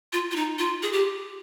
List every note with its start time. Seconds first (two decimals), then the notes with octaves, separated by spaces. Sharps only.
0.13 F4
0.31 F4
0.36 D#4
0.58 F4
0.82 G#4
0.92 G4